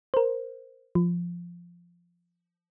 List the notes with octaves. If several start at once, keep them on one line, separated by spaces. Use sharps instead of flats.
A#4 C5
F3